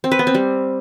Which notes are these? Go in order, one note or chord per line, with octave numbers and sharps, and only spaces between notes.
C4
B4
B3
C4
G3